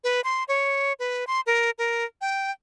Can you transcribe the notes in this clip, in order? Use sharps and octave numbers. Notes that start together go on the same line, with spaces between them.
B4
C6
C#5
B4
C6
A#4
A#4
G5